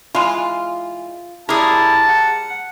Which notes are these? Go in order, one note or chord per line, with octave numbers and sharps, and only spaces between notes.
E3 G#3 F4
G3 E4 G4 G#4 A#4 A5
F#5